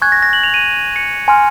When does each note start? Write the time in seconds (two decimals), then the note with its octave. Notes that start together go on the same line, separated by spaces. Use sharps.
0.02 G#5 C#6 F#6 G#6
0.12 A#6
0.23 A#6
0.33 F#7
0.44 F7
0.54 D#7
0.96 C#7
1.28 G#5 C6 F6